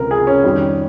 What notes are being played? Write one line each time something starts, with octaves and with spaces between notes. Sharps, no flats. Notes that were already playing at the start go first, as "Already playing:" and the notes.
Already playing: C#2 C3 F3 A#4
G#4
C#4
F2 D#3 G3